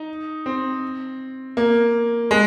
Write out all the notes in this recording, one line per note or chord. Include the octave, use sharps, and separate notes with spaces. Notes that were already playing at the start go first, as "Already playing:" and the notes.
Already playing: D#4
C4
A#3
G#3